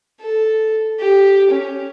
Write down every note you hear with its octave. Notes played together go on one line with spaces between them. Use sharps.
A4
G4
C#4